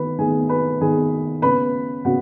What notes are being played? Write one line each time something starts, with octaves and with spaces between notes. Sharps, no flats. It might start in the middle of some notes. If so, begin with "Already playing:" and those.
Already playing: D#3 B3 B4 B5
D#3 B3 G#4 G#5
B4 B5
D#3 B3 G#4 G#5
C#3 B3 B4 B5
C#3 B3 F#4 F#5